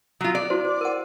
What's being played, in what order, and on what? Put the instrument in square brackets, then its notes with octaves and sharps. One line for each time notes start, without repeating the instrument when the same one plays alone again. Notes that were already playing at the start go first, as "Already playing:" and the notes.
[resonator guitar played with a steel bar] F#3 F4
D5
[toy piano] E4 F#4 C5
C5
A#4 F#5